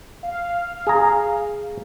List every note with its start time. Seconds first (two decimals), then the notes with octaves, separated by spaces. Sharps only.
0.23 F5
0.87 G#4 A#5